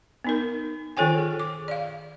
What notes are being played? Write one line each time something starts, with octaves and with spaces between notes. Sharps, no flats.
B3 D#4 A#4
D#3 F4 A4 C#5 G5 G#5
G#4
D6
D5 F5